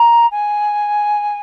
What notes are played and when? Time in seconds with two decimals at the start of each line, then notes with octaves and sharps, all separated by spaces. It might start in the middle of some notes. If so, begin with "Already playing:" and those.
Already playing: A#5
0.31 G#5